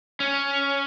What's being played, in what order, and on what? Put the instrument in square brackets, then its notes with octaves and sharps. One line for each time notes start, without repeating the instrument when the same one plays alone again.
[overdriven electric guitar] C#4